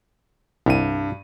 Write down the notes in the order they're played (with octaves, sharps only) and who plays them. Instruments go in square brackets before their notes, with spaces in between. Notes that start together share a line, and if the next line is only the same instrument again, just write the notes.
[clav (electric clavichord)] C2 [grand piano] G2 D#7